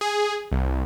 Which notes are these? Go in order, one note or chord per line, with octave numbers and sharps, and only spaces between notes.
G#4
C2